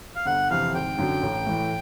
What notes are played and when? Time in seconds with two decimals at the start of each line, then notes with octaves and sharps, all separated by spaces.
0.15 F5
0.26 G1 F#5
0.50 F2 C3 E3 F5
0.75 G#1 G5
0.98 F#2 D3 F#3
1.23 A1
1.46 A2 E3 A3